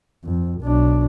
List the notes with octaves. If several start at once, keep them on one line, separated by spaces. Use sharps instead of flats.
F2
B1 D4